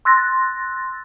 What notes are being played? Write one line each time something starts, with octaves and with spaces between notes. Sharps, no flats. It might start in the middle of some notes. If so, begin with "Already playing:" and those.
C6 E6 F#6 A6 A#6